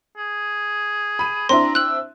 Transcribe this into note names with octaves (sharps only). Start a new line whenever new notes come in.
G#4
B5 D#7
C4 D4 E4 A#5 C6
E6 F#6 F#7